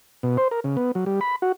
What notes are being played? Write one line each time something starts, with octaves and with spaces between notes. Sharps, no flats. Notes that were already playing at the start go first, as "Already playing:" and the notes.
B2
C5
A#4
C#3
B3
F#3
G3
B5
F#4